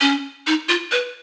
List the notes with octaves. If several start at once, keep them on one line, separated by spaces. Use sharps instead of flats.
C#4
D#4
F4
B4